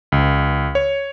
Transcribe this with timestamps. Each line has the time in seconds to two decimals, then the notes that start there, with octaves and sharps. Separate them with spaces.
0.12 C#2
0.75 C#5